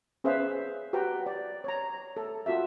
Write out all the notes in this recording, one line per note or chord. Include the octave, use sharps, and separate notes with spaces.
C#4 G#4 B4 C5 E5 F5
F#4 G4 B4 G5 A#5
D5
C#5 A#5
A4
F4 F#4 A4 E5